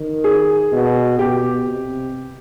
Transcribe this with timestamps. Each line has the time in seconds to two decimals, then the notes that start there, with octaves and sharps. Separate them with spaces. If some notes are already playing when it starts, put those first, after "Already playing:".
Already playing: D#3
0.24 G#4
0.72 B2
1.19 B2 G4
1.66 C3